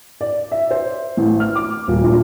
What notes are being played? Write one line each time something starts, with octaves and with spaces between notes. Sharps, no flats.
D5
E5
C5
A1
F6
D6
D#1
A#1